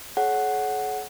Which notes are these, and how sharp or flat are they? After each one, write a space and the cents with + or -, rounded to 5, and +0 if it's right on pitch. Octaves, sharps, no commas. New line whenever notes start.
G#4 +45 C#5 -10 F#5 +0